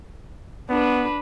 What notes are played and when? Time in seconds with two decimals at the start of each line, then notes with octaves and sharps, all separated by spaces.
0.70 B3 D4 B4